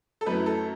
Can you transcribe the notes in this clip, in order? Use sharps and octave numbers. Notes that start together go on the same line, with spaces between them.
A4
F#2 F#3 A3 E4 B4
A4